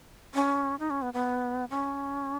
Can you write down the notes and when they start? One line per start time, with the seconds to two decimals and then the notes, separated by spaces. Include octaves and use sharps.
0.35 C#4
0.79 D#4
0.90 C#4
1.02 B3
1.14 B3
1.70 C#4